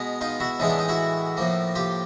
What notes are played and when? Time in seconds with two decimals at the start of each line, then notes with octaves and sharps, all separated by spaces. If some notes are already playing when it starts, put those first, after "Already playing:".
Already playing: B2 G#3 B3
0.21 D#4 F4
0.40 E4 F#4
0.59 A2 E3 G#3 B3 D#4
0.69 D4
0.79 D#4
0.89 E4 F#4
1.37 A2 F3 A#3
1.75 F4 G4